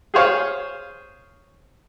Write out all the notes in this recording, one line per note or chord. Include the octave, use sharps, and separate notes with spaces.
G#4 C5 C#5 F5